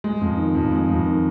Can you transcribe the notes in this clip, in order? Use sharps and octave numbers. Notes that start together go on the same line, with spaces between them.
G#3
F2
D#3
F2
G#3
F2
D#3